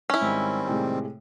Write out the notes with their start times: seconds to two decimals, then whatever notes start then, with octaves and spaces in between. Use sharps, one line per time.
0.10 C#4 E4
0.21 G#2 D#3 G3 C4
0.68 A2 C3 G#3